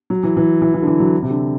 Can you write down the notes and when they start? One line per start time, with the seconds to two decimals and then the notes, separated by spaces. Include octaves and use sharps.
0.10 F#3
0.23 E3
0.37 E3
0.62 E3
0.74 E3
0.82 D3
0.87 E3
1.00 F#3
1.22 C3
1.30 D3